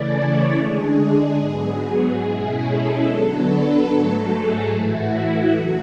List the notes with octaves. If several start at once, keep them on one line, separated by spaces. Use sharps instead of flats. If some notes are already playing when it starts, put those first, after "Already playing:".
Already playing: C#3 E3 A3 C#4 E4 D5
C#5
D3 G#3 D4 G#4
G#4
G#2 F#3 B3
G#4
B2 G#3 C#4 E4
A4
D3 F#3 B3 D4
B4
G#2 F#3 A3 A4
G#4
A2 E3 A3 E4 F#4
E2 C#3 F#3 F#4